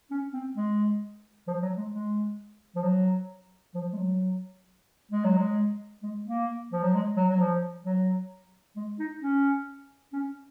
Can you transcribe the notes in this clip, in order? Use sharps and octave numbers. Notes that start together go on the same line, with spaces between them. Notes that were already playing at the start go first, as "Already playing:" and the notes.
C#4
C4
G#3
F3
F#3
G#3
G#3
F3
F#3
F3
G#3
F#3
G#3
F#3
G#3
G#3
A#3
F3
F#3
G#3
F#3
F#3
F3
F#3
G#3
D#4
C#4
C#4